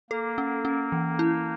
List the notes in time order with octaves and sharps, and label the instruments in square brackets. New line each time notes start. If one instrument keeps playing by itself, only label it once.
[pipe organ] A#3 [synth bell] A4
[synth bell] C#4
C#4
E3
E4